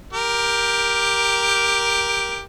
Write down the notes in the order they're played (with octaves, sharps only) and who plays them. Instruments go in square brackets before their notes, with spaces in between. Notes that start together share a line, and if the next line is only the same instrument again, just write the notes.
[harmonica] G4 A#4